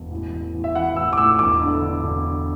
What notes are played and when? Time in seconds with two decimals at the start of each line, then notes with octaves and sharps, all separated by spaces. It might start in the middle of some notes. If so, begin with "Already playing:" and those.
Already playing: E1
0.11 A1
0.32 A1
0.54 A1
0.64 E5
0.75 E3 F#5
0.96 A1 E6
1.13 D6
1.18 A2 E6
1.39 E1 D6
1.62 D3
1.82 D3
2.04 E1
2.25 D3